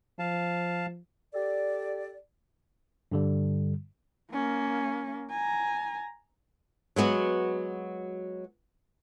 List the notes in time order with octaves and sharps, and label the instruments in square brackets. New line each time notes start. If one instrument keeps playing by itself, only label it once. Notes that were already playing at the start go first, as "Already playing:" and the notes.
[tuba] F3 [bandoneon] F5 A5
[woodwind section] G4 A4 D5
[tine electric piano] G2 D3 G3
[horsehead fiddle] A#3 C#4
G#5 A#5
[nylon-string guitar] F#3 G#3 B3 F#4